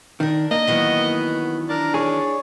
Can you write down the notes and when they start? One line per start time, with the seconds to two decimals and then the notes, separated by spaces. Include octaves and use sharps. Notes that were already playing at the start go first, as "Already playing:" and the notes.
0.20 D#3 D4 A#4
0.51 A#3 D#5
0.67 D#3 E3 F#3 B3
1.69 D4 A#4
1.94 G#4 C#5